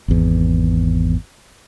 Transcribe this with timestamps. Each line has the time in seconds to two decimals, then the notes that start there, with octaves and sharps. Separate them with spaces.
0.08 G#1 E2